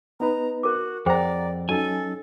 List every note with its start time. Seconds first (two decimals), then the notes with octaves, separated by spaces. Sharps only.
0.20 B3 D#4 B4 A#5
0.63 F#4 A#4 D6
1.06 F2 G#4 C5 D5 F#5 G5 A#5
1.69 F#3 C#4 D#4 A4 G#5